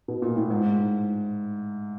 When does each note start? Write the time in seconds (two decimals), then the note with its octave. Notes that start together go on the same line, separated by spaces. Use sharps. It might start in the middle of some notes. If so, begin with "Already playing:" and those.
0.08 B2
0.22 A#2
0.36 A2
0.50 G#2